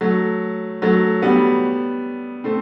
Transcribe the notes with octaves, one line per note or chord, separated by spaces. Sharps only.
F#3 A3
F#3 A3
G3 B3
A3 C4